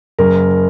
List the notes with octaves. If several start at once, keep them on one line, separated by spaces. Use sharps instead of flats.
F#1 A#4